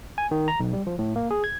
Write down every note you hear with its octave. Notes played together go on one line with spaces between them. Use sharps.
G#5
D#3
A#5
B1
G3
F3
A2
A#3
G#4
G#6